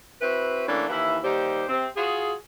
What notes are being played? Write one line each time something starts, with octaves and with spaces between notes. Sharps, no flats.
C4 E4 F#4 B4
E3 A3 A#3 C#4 D4
D#2 E3 E4
D#2 G3 D#4 G4 C5
C3 C4
F4 F#4 G#4